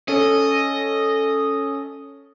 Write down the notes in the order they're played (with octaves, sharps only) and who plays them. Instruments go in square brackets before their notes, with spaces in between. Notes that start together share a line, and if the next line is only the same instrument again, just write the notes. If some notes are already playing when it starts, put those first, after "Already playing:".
[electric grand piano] C#4 A4 [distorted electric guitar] D#5